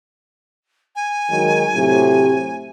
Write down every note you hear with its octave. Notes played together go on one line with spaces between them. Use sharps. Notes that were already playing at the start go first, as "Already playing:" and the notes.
G#5
D#3 F#3 G#3
A2 C3 F#3